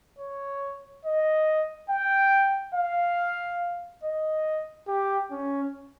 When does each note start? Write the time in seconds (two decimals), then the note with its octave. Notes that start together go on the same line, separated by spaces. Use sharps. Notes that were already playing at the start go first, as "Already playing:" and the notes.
0.19 C#5
1.05 D#5
1.90 G5
2.75 F5
4.04 D#5
4.88 G4
5.31 C#4